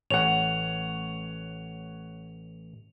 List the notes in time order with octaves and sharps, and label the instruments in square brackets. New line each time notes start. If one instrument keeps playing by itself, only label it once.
[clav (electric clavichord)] A1 [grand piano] C#5 F#5 [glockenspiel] F7